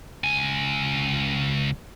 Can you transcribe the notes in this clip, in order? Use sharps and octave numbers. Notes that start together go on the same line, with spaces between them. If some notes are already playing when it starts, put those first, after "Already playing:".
C#2 G#5